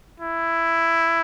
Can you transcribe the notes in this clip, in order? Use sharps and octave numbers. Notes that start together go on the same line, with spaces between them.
E4